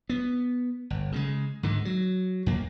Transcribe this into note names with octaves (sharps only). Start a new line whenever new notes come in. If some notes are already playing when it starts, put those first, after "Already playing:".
B3
G1
C#3 G3 G#3
G#2 D3 D#3
F#3
F2 A#3